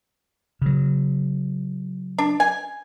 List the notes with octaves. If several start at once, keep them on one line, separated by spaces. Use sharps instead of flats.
C#3 F#3
D4
G#5